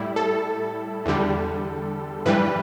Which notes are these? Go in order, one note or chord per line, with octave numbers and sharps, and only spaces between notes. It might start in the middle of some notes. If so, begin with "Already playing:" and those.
Already playing: A2 G3 E4
A4
E2 D3 G3
G2 E3 G3 B4